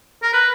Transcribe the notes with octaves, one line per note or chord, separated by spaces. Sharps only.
A#4
B4